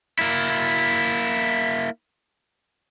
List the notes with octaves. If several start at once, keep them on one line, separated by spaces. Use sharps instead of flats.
A#3 E4